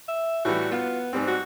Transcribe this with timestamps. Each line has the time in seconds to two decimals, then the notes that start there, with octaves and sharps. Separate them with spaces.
0.08 E5
0.45 A2 E3 G3 F#4
0.72 B3 F4
1.13 G#2 G3 C4
1.27 F#4